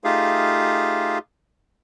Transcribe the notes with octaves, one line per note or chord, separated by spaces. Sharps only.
A3 D#4 F4 G4 G#4 F5